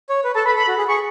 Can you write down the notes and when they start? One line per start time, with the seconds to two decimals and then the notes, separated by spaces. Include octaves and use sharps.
0.09 C#5
0.24 B4
0.35 A4 A5
0.46 B4 B5
0.56 A4 B5
0.68 F#4
0.78 G#4
0.88 G#4 C#6